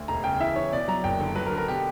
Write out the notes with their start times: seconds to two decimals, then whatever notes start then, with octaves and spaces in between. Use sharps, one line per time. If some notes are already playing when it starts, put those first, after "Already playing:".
Already playing: D2
0.08 E1 A#5
0.24 C#3 G5
0.40 E3 E5
0.56 E3 C#5
0.72 B2 D5
0.88 F#3 A#5
1.04 F#1 G5
1.20 D3
1.35 F#3 B4
1.46 A#4
1.52 D3
1.58 A#4
1.68 B2 G4